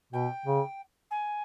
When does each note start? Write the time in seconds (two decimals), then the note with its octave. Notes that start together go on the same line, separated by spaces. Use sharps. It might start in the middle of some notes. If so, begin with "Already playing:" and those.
0.13 B2 G5
0.46 C#3
1.11 G#5